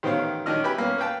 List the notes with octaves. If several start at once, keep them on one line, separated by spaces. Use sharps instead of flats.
A1 D#3 B3 C5 C#5 F5
D#3 C#4 D4 D#5 F6
E4 G4 B4 G5 G#5 B5
A#3 B3 C#4
B4 F5 G5 A5